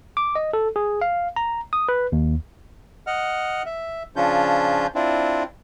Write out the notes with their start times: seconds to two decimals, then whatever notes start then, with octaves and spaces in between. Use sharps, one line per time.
0.17 D6
0.35 D#5
0.53 A4
0.76 G#4
1.01 F5
1.36 A#5
1.73 D#6
1.89 B4
2.12 D#2
3.07 D#5 F#5 F6
3.66 E5
4.16 C#3 F3 C#4 D4 F4 G6
4.95 C4 D4 E4 F4